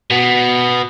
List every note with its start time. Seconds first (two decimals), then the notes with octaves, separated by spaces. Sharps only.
0.10 B2 B3